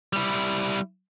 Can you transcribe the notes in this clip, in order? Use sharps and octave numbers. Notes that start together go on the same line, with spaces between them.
G3 E4